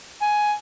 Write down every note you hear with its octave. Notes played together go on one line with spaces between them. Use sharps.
G#5